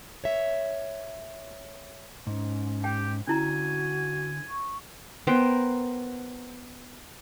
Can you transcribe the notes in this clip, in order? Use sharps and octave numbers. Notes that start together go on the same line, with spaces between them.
C#5 E5
G#2 C#4
G4 G5
D3 C#4 E4 F#4 G#5 A#5
C#6
B3 A#4 C5 G5